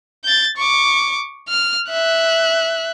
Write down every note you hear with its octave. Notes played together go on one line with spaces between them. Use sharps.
G6 A6
C#6 D6
F6
E5 F#6